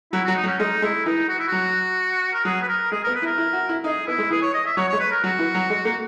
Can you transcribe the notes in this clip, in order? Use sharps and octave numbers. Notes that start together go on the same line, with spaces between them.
F#3 E4
F#3 F#4
D#4
F#3
C#4
G#3 D#4
G#3 E4
E3 D#4
F#4
E4
F#3 F#4
A#4
F#3 G#4
B4
A#4
G#3 G#4
B3 A#4
B4
E4
A#4
E4
F#4
E4
D#4 G#4
B3 E4
G#3
E3 G#4
C#5
D#5
E5
F#3 C#5
G#3 C#5
B4
A#4
F#3 F#4
E3
F#3
G#3
A#3